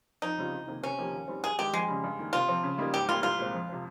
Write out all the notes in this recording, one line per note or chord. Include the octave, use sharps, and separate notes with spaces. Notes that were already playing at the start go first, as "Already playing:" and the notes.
F2 D#4
C#3 G3 C4 F4
C2
C3 D#3 A#3
C3 C#4
F3 A#3 D#4 G4
D#2
D#3 G3 C4
G2 G#4
D#3 G#3 D#4 G4
F2 G#3
C#3 G3
G2
D#3 A#3
C3 F4
F3 C4
C#3
G3 A#3 D#4
G#2 G4
G3 A#3 F4
C2 F4
A#2 G#3 C4
F2
C3 F3